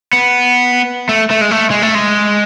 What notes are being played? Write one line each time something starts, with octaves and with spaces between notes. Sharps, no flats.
B3
A3
A3
G#3
A3
G#3
A3
G#3